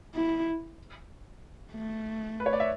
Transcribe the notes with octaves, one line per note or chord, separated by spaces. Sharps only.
E4
A3
B4
C#5
D5
E5